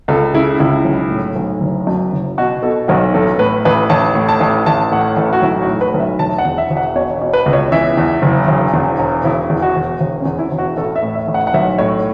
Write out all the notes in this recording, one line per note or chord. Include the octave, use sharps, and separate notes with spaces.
C#2 A4
C#3 E4
C#2 E4
B1
A2
B1
F#1
F#2
F#1
B2 F#4
B2 A4
B1 F#4
A1 A4
A2 B4
A1 B4
A1 A5
A2
A5
A1
A1 A5
A2 F#5
A1 A4
F#4
B1 E4
F#4
A2
B4
B1
E5
E1 A5
F#5
E2
E5
E1
F#5
B2 C#5
B2
B4
C#2
C#5
E3 E5
E2
F#1
E1
E2
E1
E1 E4
E2
F#4
E1
E1
C#4
E2
E4
E1
F#4
A1 A4
E5
A2
E5
A1
F#5
F#5
B1 E5
A2 C#5